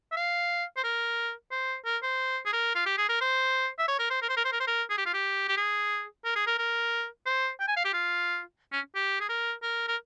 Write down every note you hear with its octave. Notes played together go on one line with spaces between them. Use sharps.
E5
F5
C5
A#4
C5
A#4
C5
G#4
A#4
F4
G4
G#4
A#4
C5
E5
C#5
A#4
C5
A#4
C5
A#4
C5
A#4
C5
A#4
G#4
G4
F4
G4
G4
G#4
A#4
G#4
A#4
A#4
C5
G5
G#5
F5
G4
F4
C#4
G4
G#4
A#4
A#4
A#4